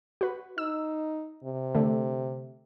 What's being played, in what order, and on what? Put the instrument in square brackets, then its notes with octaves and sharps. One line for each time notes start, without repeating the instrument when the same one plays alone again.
[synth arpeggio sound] F#4 B4
[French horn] D#4 [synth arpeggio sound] E6
[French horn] C3
[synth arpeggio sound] D3 A3